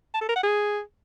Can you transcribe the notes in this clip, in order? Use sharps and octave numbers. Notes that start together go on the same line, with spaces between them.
A5
A4
A#4
F#5
G#4